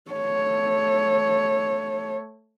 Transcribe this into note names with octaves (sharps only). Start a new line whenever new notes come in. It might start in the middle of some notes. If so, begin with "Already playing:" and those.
A3 C#5